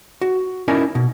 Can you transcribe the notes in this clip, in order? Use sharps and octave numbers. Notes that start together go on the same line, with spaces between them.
F#4
C#4 D#4 E4 A#4 D5 D#5
B2